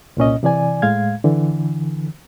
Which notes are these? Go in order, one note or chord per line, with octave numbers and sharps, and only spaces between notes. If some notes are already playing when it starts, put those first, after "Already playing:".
C2 A#2 C#4 D#5
C3 E3 D5 G#5
A2 G#3 F5 G#6
D3 E3